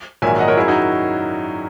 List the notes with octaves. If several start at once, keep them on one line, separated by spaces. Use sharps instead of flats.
A#1 G#2 D#3 F#3 E5 G#5
D#5 F#5
A#4 C#5
F#2 D#3 F#3 E4 G#4
D#4 F#4